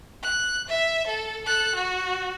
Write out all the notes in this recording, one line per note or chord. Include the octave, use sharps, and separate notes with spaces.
F#6
E5
A4
A4 F#6
F#4